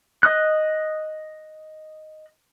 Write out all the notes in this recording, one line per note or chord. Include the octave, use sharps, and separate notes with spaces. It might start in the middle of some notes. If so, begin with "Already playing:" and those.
D#5 D#6 F#6